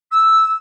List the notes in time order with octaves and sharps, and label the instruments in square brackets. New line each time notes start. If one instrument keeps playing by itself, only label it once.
[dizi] E6